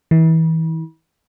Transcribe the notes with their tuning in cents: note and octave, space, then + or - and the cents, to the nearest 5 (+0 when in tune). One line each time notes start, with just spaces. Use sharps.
E3 -35